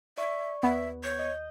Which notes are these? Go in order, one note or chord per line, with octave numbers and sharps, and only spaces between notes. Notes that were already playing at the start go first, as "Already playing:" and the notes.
D5 E5 C#6
D#2 B3 E5
C#5 G6
D#5